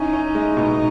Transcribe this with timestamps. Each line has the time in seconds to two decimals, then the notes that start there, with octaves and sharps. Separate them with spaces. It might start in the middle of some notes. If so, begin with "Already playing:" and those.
Already playing: C#4 D#4 E4
0.13 C#4
0.35 G#3
0.57 B2